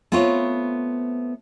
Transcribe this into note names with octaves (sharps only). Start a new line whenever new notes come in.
A3 B3 C4 F4 C5 C#5